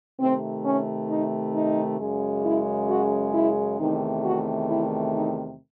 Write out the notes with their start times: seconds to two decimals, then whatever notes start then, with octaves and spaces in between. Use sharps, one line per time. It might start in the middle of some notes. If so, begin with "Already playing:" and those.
0.19 C3 D#3 A3 C4
0.65 C#4
1.09 D#4
1.54 D#4
1.99 F#2 C#3 G#3
2.45 E4
2.89 F#4
3.34 E4
3.78 E2 C3 D#3 A3 D#4
4.24 F#4
4.69 E4
5.14 D#4